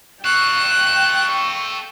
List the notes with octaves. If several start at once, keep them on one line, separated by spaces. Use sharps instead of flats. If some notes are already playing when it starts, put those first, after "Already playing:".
A4 F5 G5 C#6 F#6